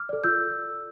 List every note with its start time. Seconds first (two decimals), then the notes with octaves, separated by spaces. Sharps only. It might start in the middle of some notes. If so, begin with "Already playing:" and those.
Already playing: D6 F6
0.09 A4 D5
0.24 F4 E6 G6